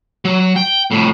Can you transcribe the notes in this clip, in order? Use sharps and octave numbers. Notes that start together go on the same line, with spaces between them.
F#3
G5
F2 A2